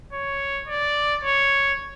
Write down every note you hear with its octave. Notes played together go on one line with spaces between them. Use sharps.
C#5
D5
C#5